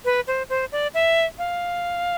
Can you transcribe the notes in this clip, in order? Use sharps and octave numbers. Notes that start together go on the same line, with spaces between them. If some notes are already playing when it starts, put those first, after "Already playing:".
B4
C5
C5
D5
E5
F5